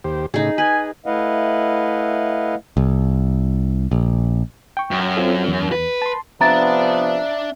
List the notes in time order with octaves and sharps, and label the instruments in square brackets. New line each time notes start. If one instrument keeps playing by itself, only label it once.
[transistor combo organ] D#2 G4 C5
[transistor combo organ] A2 C#3 [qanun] D#4 G#4
[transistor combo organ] G#4 [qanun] B4 [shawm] G#5
[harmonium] A3 E4 B4 D#5 F5 F#5
[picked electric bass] C2
A#1
[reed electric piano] G5 C#6
[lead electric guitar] F#2
[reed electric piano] C4 F4 A4
E2
[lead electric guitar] B4
[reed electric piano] A5 C6
[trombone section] C3 F3 B3 [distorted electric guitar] D4 D5 [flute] E5 [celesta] A#5 A6